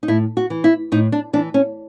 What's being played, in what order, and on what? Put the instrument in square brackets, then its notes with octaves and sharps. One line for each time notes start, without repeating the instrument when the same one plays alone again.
[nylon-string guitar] D#4
A2 E4
F#4
E3
E4
A2 D#4
D4
E3 D4
C#4